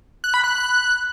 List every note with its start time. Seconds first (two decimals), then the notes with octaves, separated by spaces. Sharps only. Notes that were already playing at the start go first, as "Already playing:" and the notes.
0.24 F#6
0.34 B5
0.44 F#6